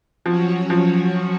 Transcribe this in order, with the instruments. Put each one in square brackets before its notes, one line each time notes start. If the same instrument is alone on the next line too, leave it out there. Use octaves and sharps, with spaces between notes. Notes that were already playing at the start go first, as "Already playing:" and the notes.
[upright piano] F3 [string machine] F#3 C#4 F#4 C#5
[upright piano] F3